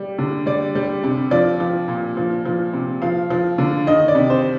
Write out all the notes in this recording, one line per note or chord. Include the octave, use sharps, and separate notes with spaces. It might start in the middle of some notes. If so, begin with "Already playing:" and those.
Already playing: G3
D3
G3 D5
G3
C3
F3 D5
F3
A#2
F3
F3
C3
F3 F5
F3
D3
D#3 D#5
D5
C3
C5